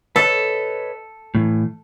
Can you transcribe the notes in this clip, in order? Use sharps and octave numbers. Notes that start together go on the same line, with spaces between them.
A4 B4 C#5 D#5
A2 E3